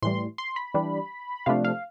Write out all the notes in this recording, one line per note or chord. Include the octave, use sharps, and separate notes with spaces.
A2 E3 G3 C6
C6
B5
E3 G3 D4
C3 F3 A3 D4 F5
F5